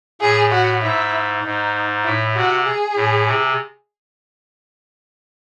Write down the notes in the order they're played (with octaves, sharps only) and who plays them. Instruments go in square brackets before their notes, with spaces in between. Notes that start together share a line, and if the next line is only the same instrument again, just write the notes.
[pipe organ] A2 [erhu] G#4
[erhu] F#4
[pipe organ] G#2 [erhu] E4
[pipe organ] G#2 [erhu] D#4
[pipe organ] A2 [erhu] E4
[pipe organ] C3 [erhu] F#4
[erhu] G#4
[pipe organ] A2
C3